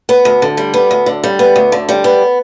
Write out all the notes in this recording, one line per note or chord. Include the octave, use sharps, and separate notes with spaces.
B3
D2
D3
G3
B3
D2
D3
G3
B3
D2
D3
G3
B3